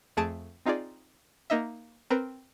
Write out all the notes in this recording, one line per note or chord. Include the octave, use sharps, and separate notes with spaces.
F2 A3 G#4 A5 D7
C4 D#4 F4 G#4 D5
A#3 D#4 D#5 E5
C4 A#4 B4 A#5